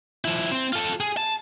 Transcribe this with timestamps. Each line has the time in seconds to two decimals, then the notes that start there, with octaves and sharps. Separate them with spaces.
0.25 F3 E4
0.51 C4
0.73 F4 A4
1.00 G#4
1.17 A5